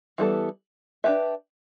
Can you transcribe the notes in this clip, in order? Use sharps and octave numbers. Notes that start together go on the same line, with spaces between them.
E3 G3 B3 E4 A4
D4 G4 B4 E5